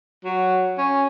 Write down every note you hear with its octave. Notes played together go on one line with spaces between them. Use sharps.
F#3
C#4